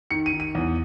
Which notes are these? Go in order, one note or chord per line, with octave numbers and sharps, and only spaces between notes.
D#3 C#7
D#7
D#3
D#7
E2